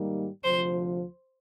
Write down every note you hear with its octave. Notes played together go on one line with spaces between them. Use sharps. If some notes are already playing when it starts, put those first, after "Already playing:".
Already playing: G#2 D#3 G3 A#3 D#4
D2 C3 F3 C5